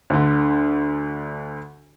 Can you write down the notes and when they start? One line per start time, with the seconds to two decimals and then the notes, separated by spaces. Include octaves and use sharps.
0.10 D2 D3